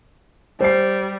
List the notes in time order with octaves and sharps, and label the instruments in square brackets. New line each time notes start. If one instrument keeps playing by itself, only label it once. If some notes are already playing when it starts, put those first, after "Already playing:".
[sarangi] G3 [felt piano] C5 C7